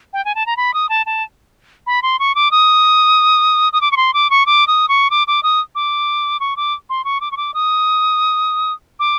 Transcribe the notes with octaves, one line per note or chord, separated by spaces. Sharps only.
G5
G#5
A5
A#5
B5
D#6
A5
A5
B5
C6
C#6
D6
D#6
D#6
D6
C#6
C6
D6
C#6
D6
D#6
C#6
D6
D6
D#6
D6
C#6
D6
C6
C#6
D6
C#6
D6
D#6
D6